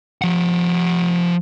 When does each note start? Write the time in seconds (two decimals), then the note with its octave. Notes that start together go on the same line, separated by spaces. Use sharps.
0.22 F3 F#5